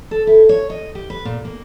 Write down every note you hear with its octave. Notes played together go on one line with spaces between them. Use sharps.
A4
E4
C#5
D#5
G4
B4
A#2
A#3